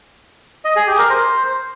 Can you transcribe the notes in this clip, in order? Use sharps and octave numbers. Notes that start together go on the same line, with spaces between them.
D#5
G#4
G4
A#4
C5